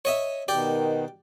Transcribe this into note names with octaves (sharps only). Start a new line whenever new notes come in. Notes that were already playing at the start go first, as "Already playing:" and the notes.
C#5 D#5 E5
B2 D#3 G4 D5